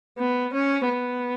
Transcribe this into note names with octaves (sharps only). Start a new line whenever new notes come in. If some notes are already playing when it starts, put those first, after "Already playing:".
B3
C#4
B3